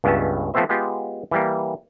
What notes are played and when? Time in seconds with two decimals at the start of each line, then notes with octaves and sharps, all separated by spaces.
0.04 C#2 G2 B3 C#4 E5 A5
0.54 F3 A3 B3 C4 C5 E5
0.69 G#3 B3 F4 G4
1.31 E3 G3 A#3